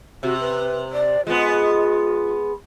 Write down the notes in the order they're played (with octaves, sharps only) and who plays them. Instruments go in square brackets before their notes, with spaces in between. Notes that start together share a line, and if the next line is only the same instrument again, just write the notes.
[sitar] C3 [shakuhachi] F#4
[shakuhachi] B4
D5
[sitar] G#3 B3 [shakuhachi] F4